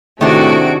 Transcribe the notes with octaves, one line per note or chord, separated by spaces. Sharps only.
A2 C3 D#3 A3 D4 F#4 G#4 D7